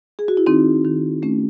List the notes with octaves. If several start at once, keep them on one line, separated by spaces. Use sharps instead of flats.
G#4
F#4
E4
D#3 C4 D#4
D#3
A3 C#4